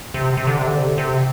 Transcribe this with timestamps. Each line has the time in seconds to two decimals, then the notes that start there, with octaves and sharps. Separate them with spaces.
0.14 C3
0.37 C3
0.47 D3
0.57 C3
0.68 D3
0.77 C3
0.87 D3
0.98 C3